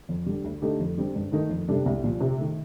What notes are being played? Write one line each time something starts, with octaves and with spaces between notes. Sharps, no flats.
F2
D3 G3
D2
D3 A3 D#4 G4
F2
D3 G3 C4
G2
D#3 A3 D#4 A#4
F2
C3 G3 D4 A4
C2
A#2 F3
C3
D#3 A3